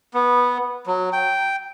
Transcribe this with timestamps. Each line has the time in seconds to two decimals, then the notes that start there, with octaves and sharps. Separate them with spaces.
0.14 B3
0.87 F#3
1.13 G5